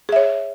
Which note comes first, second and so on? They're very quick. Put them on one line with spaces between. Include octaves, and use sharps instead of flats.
G#4 E5 C#5